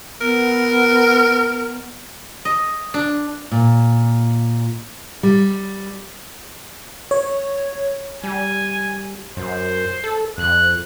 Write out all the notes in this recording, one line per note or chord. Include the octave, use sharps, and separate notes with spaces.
B3 A#4
D#5
D4
A#2
G3
C#5
G3 G#5
F#2 C5
A4
F2 F#6